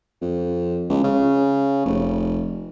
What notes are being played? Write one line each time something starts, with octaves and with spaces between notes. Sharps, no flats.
F2
C#2
C#3
F1